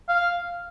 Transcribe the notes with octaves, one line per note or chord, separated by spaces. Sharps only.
F5